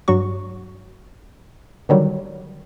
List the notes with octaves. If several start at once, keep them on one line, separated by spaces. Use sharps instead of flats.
G2 F#3 F#4 C#6
D3 D#3 F#3 G3